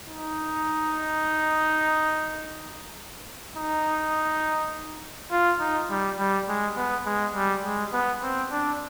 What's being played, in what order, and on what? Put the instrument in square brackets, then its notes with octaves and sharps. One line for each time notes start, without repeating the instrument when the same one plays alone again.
[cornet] D#4
D#4
F4
D#4
G3
G3
G#3
B3
G#3
G3
G#3
B3
C4
D4